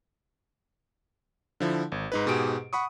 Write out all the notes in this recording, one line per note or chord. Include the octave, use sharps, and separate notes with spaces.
D3 F3 E4
G#1
G#2 D#4 B4
G#2 B2 G4 G#4 D7
F#5 B5 C#6 D#6